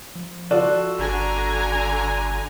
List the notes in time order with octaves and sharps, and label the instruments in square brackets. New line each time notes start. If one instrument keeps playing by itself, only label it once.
[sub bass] F3
[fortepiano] F4 D5 [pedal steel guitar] F#4 A4
[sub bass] G1 [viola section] D3 G#5 A#5